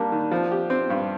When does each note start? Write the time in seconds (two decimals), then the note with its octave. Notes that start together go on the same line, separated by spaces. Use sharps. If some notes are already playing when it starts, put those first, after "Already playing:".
Already playing: G3 A#3 D4
0.12 D#3
0.31 F3
0.51 G4
0.70 C4
0.90 G2